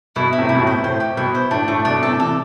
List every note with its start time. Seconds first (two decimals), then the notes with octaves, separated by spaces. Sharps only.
0.16 B2 E4
0.33 E4
0.38 A2 C3
0.49 E4
0.55 B2
0.61 A2 C3
0.67 C5
0.83 A2 C5
1.00 G4
1.17 B2 E4
1.35 C5
1.51 A2 D4
1.68 A2 A3
1.85 B2 D4
2.02 A2 C3 A4
2.19 C3 E3 A4